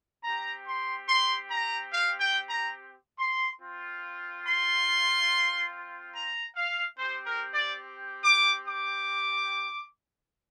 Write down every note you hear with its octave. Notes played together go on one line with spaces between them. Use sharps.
C4 G4 A#5
C6
C6
A#5
F5
G5
A#5
C6
C4 F4
C6
A#5
F5
C4 G4 C5
A#4
D5
D6
D6